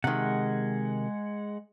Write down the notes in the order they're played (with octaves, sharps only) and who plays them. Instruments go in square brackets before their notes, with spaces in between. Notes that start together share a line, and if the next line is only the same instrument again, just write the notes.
[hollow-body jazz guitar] C3 D#3 [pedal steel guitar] G#3 F#5